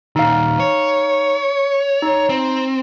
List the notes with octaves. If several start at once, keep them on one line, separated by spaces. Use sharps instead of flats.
A#2 D#3 D#4 F5
C#5
D#4
C4